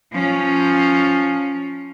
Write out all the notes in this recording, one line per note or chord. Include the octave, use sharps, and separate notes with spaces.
F3 C#4